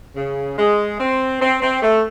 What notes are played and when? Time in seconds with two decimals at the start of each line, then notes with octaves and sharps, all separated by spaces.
0.16 C#3
0.57 G#3
0.99 C4
1.41 C4
1.62 C4
1.82 A3